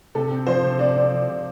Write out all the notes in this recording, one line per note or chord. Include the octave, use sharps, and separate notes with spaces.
C3 A4
C4
F3 C5
C3
C3 D5
C4
F3
C3